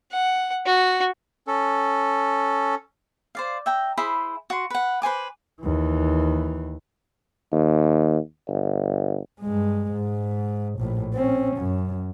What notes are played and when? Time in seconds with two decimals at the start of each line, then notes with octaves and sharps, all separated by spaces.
0.12 F#5
0.66 F#4
1.47 C#4 A4
3.35 C5 D5 F5
3.66 E5 G5 A#5
3.97 E4 G#4 C5 B5
4.50 F#4 C6
4.70 B4 F#5
5.02 B4 C5 G#5 D6
5.61 D#2 E3
7.52 D#2
8.48 G1
9.41 G2 G#3
9.91 G#2
10.79 A#1 A2
11.13 C4 C#4
11.57 F#2